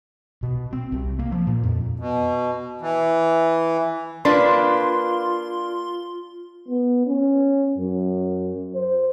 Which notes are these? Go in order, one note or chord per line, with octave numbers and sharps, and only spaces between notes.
B2
C4
C2
A#3
F3
A#2
F2
B2
E3
A#3 D4 F4 B4 C6
B3
C#4
F#2
C5